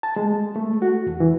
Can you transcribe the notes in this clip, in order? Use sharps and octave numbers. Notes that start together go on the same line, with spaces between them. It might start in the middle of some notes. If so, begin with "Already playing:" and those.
A5
G#3
A3
F#4
E2
E3